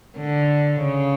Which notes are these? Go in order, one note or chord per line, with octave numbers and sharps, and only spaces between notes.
D3
C#3